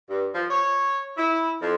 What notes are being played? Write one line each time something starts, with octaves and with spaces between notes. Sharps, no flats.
G2
F3
C#5
E4
F2